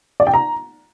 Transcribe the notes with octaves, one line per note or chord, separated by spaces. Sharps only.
D5
G5
A#5